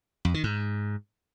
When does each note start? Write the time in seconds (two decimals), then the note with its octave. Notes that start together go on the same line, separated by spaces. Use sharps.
0.25 F2
0.34 D#3
0.44 G#2